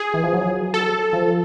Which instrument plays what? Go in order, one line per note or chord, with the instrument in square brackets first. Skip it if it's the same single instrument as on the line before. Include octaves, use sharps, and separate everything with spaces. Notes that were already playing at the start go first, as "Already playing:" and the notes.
Already playing: [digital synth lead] G#4
[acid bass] E3
F3
F#3
[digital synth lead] A4
[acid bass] F3